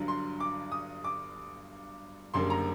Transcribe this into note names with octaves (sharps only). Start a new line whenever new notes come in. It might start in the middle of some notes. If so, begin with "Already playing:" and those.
Already playing: G1 G2 D3 F#3
C6
D6
D#6
D6
F#1 F#2 D3 G3 A#3 C6
A#5